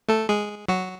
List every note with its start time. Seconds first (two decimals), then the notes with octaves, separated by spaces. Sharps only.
0.09 A3 A4
0.29 G#3 G#4
0.68 F#3 F#4